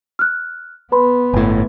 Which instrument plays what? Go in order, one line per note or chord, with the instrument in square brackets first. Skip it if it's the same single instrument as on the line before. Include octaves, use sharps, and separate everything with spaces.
[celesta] F6 F#6
[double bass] B3 [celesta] B4 B5 C6
[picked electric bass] G1 A2